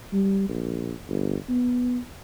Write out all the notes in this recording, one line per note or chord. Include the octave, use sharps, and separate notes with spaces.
G3
A#1
G1
B3